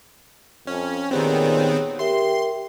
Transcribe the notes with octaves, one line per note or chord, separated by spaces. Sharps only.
F2 C#4
A#2 D#3 B3 C4 G4 G#4 C#5
G4 A#4 E5 C6